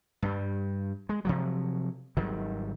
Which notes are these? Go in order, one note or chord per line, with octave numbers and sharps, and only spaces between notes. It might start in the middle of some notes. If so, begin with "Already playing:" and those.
G2 G3
G#3
C3 F3 F#3
G#1 D#3 F#3 G3